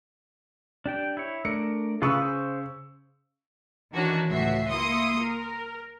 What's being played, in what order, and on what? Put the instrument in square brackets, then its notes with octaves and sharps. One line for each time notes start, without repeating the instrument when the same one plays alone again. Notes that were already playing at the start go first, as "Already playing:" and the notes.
[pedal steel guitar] D4 G4 G5
E4 C#5
[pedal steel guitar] A3 D4 A#4 [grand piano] C#7
[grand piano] C#3 C#6 E6 [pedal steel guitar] F4 G#4 B4
[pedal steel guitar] C5
[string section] D#3 E3 C#4 D4 F#4 A#4
C#2 A2 F#4 E5 C7
A#3 E4 C6 D#6 C#7
A#4